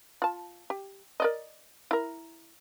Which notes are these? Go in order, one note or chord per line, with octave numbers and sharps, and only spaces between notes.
F4 A5
G4
A#4 D5 D#5
E4 A#4